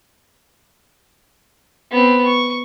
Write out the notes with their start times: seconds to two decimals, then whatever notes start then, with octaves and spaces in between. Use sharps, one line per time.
1.92 B3 C4
2.26 C#6